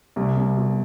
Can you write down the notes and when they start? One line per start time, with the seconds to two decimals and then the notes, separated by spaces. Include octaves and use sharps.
0.16 C2
0.37 C2
0.57 B2